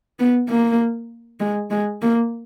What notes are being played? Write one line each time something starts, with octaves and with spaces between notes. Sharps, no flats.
B3
A#3
G#3
G#3
A#3